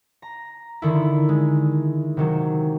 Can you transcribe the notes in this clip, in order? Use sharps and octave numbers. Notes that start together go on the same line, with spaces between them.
A#5
D3 D#3 E4
G#3
C3 D#3 F#3